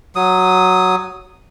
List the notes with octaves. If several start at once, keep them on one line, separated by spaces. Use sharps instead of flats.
F#3 D#6